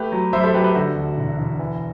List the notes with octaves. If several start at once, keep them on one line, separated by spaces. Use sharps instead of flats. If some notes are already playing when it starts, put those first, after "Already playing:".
Already playing: A3 G4 B4
F#3
F#2 C5 E5
A4 C5
F#2 G4 B4
G4 B4
D3 F#4 A4
D2
E1
E1
E3